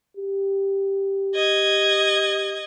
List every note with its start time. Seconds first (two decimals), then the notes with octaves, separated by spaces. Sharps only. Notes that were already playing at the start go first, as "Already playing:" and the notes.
0.17 G4
1.35 D#5 G#6